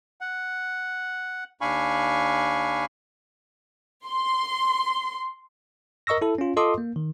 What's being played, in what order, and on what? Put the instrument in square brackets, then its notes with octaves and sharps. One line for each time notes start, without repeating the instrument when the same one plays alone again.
[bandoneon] F#5
D#2 D4 F5 G#5 B5 C#6
[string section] C6
[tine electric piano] A#4 D#5 C#6 E6 A#6
E4 A4
C#4 F4
F4 A4 D#5 C6 D6 D#6
A#3
D#3